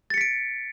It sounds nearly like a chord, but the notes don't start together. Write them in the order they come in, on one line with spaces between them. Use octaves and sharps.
A6 C#7 B6 D7